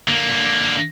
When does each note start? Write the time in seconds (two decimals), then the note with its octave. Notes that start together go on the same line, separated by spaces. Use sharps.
0.08 D3 A#3